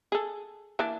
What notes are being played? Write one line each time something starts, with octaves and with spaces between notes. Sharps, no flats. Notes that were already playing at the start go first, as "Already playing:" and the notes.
G#4 A4
E3 A#3 D4